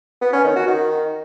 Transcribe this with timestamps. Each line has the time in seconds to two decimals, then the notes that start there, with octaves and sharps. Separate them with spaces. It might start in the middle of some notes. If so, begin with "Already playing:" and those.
0.22 B3
0.33 C#4
0.44 D#3
0.56 F#4
0.67 D#3